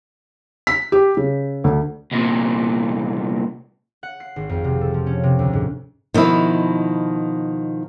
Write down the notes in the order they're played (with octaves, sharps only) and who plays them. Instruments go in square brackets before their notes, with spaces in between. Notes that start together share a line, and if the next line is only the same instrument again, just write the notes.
[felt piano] B6
G4
C#3
D2
[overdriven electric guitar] C2 A#2
[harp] F#5
C7
G#1
F2
C3
A4
F3
C#4
C3
D2
G#2
[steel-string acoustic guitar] B2 F3 [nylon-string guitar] D#3 E4